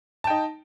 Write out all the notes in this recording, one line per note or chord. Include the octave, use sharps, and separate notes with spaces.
D#4 G5 A5